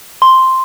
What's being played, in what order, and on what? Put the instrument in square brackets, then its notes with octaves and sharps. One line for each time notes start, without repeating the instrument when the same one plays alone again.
[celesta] C6